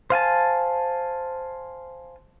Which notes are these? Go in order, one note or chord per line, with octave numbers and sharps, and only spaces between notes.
C5 F5 G#5 A5